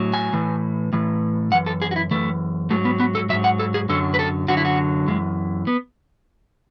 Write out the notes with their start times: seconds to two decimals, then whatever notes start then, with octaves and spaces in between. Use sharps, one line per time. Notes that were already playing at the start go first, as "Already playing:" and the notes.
Already playing: A2 F#3
0.14 G#5
0.33 A2 E3
0.93 A2 E3
1.52 F#2 E3 F#5
1.66 A4
1.82 G#4
1.91 F#4
1.96 E4
2.11 F#2 E3 A3
2.70 G#2 F#3 A3
2.85 B3
3.00 B3
3.15 A4
3.29 F#3 E5
3.33 G#2
3.44 F#5
3.59 A4
3.74 G#4
3.89 F#2 D3 F#3 A4
4.14 B4
4.19 A4
4.48 F#2 D3 F#3 F#4
4.57 E4
4.65 F#4
5.07 F#2 E3 G#3
5.67 B3